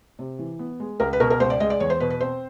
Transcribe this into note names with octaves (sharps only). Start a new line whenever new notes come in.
C3
E3
B3
G#3
C#2 A#4
B4
B2 A#4
A#4
C#2 C5
D5
G#3 D#5
D5
E2 C#5
C5
B2 B4
B4
C4 C5